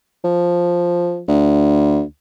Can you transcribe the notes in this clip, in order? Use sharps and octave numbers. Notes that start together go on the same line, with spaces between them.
F3
D2